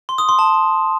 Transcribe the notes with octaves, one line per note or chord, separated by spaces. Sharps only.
C6
D#6
C6
A5